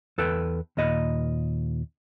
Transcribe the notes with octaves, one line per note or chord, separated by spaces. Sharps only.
E2 A4 B4 G5
D#2 A#2 D#5 B5